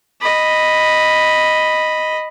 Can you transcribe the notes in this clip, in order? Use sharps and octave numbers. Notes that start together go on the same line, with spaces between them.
D#5 B5